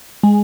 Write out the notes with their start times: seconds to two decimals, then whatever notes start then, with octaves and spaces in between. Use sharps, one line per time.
0.23 G#3